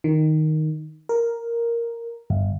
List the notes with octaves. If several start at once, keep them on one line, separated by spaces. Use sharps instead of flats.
D#3
A#4
G1